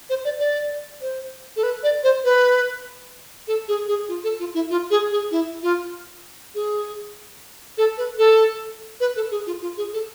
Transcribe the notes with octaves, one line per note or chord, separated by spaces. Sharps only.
C5
D5
D5
C5
A4
B4
D5
C5
B4
A4
G#4
G#4
F4
A4
F4
E4
F4
G#4
G#4
E4
F4
G#4
A4
B4
A4
B4
A4
G#4
F4
F4
G#4
A4